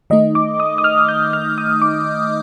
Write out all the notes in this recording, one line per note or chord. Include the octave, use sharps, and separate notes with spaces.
D#3 A3 D#4 D#5
D6
D#6
D#6
F6
G6
F6
D#6
D6